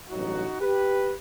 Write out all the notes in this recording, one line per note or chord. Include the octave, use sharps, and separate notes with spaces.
A1 G2 F#3 D#4 F#4
G4 B4